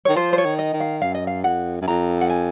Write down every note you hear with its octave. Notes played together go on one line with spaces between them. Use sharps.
D#3 C#5
F3 C5
C5
C#5
D#3
D#5
D#3
F5
F#2 F5
D#5
F5
F2 F#5
F#2
F2 A#5
F#5
G#5